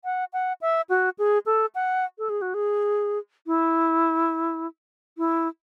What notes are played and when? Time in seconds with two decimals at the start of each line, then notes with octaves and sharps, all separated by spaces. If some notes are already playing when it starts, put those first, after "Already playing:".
0.04 F#5
0.33 F#5
0.61 E5
0.89 F#4
1.18 G#4
1.46 A4
1.75 F#5
2.18 A4
2.29 G#4
2.42 F#4
2.54 G#4
3.47 E4
5.18 E4